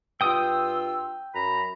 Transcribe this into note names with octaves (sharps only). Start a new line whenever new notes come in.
G2 F4 G5 D#6 E6
F#2 A#5 B5